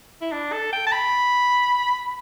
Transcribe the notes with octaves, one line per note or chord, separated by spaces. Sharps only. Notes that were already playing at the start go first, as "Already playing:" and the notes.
E4
D4
A4
G5
A5
B5